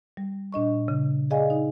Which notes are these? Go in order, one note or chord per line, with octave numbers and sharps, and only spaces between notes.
G3
A#2 D4 D#5 C#6
C#3
G#4 D5 D#5 F5 G#5
D#4